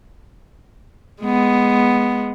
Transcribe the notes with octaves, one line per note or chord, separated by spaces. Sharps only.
G#3 B3